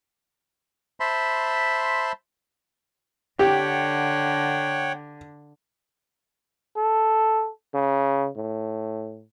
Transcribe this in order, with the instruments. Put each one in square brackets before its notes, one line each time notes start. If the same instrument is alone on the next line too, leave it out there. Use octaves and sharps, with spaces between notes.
[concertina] C5 E5 A5 B5 C6
[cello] D3 [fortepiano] G4 [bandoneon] C#5 F#5 G5
[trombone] A4
C#3
A2